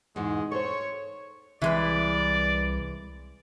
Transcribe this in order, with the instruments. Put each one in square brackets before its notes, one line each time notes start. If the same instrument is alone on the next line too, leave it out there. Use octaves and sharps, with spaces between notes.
[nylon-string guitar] E2 G#2 B2 [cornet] G#3
[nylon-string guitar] A4 C5 [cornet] C#5 [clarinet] C#6
[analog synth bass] C2 [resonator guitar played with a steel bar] E3 G#3 B4 [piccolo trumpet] D5